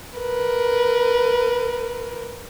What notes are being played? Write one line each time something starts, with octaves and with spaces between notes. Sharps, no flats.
A#4 B4